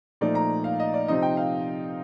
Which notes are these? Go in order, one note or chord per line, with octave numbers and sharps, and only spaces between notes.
A#2 F3 A3 D#4 D5
A#5
F5
D#5
D5
C3 F3 C4 D#4 D#5
G5
F5